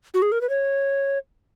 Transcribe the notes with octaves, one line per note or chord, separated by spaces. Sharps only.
F#4
G#4
A#4
B4
C#5